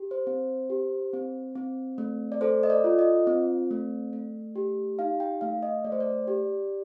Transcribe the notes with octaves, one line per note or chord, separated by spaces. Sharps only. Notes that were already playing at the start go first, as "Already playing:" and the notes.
Already playing: G4
C5
C4
G4
C4
C4
A3
D5
A4 C5
D#5
D5
F4
D#5
C4
A3
A3
G4
D#4 F5
G5
A3 F5
D#5
A3 D5
C5
D5
G4